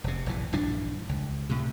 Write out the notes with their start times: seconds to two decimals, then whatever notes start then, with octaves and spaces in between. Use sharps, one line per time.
0.04 F1 C3
0.26 F1 A#1 E3
0.53 A#1 G2 E3 D4
1.09 C#2
1.50 A2 C3